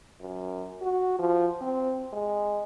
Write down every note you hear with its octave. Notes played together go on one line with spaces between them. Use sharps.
F#2
F#4
F3
C4
G#3